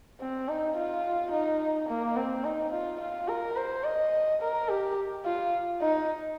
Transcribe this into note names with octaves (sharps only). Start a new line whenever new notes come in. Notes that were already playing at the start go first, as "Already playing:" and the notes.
C4
D#4
F4
D#4
A#3
C4
D#4
F4
F4
A#4
C5
D#5
A#4
G4
F4
D#4